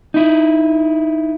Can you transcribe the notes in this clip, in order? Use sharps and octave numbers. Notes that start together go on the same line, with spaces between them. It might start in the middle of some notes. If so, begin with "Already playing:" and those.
D#4 E4